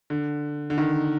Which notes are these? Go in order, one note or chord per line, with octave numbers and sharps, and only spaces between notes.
D3
D3
D#3